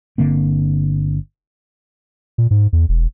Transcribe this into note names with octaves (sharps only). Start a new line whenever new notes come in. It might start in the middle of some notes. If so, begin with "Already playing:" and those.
G1 D3 A#3 C4
A#2
G#2
E2
E1